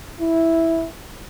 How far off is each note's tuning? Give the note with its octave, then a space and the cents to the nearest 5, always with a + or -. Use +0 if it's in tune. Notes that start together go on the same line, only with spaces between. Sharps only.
E4 -5